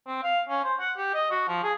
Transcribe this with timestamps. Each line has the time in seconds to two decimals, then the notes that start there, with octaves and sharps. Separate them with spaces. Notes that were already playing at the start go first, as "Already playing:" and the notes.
0.07 C4
0.23 F5
0.49 C#4
0.64 C5
0.80 F#5
0.98 G4
1.14 D#5
1.31 F#4
1.48 F3
1.63 G#4